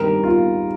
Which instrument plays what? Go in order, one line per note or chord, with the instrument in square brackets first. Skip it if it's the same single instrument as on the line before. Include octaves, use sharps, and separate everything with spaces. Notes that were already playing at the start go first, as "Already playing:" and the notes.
Already playing: [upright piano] G2 D#3 G3 C4 G4 [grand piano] A#4
[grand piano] F4